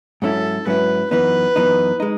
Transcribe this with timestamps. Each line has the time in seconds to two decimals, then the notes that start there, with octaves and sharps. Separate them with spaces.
0.22 G#2 F#3 C#4 E4 A4
0.66 G#2 F#3 C#4 E4 B4
1.11 F#2 E3 B3 D#4 B4
1.56 F#2 E3 B3 D#4
2.00 G#3 D#4